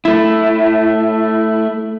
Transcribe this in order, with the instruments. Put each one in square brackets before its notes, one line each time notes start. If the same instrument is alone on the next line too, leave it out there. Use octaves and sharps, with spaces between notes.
[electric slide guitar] A3 E4